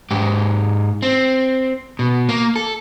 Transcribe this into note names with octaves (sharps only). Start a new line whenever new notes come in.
G#2 G4
C4
B2
A#3
A4